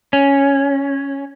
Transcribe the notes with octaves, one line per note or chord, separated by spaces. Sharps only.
C#4